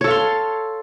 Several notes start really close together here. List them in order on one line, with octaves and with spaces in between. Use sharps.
C#5 A4 F5 C6